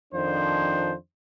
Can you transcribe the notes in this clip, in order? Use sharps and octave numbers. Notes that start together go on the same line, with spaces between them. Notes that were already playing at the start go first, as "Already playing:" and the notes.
F2 D#3 F3 D4 C5